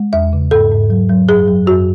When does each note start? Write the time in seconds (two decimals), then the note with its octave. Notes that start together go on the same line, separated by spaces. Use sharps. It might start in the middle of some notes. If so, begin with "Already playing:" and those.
Already playing: G#3
0.13 E2 E5
0.33 C#3
0.51 G#2 A4
0.71 G#2
0.90 F#3
1.09 F#3
1.28 F#2 G#4
1.47 F#3
1.67 F#2 F#4